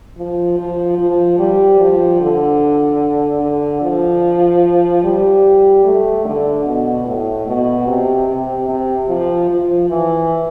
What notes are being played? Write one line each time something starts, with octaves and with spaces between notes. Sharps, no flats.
F3
F3
F3
G3
F3
D3
D3
F3
G3
A3
D3
B2
A2
B2
C3
C3
C3
F3
F3
E3